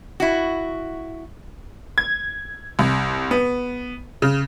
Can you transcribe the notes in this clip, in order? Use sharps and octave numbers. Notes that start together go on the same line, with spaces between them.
E4 F#4
G#6
C2
B3
C#3